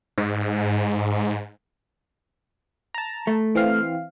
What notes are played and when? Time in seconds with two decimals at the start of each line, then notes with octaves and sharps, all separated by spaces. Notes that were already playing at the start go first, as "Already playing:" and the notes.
0.18 G#2
2.94 A5 A#5
3.27 A3
3.55 E3 C4 F5